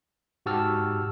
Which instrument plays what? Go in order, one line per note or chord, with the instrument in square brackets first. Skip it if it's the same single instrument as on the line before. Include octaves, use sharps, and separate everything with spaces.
[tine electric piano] G#2 F#4 G4 A5 E6 F6